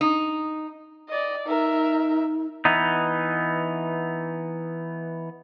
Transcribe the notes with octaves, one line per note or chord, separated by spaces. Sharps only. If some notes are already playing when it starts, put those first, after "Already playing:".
D#4
D5 D#5
D#4 A#4 E5
E3 B3 D#4